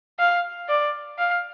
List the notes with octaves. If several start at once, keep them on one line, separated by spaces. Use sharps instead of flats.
F5
D5
F5